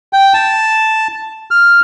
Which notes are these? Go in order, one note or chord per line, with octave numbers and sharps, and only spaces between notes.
G5
A5
F6